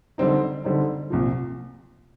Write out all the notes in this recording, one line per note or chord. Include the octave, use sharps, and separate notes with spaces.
D3 G3 C4 D#4
D3 G3 C4 D#4
C2 A#2 F3